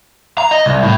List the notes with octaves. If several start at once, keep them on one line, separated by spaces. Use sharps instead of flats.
A#5
D#5
C2
A2